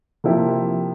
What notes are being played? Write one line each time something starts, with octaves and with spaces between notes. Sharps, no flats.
C3 F3 A#3 E4 G4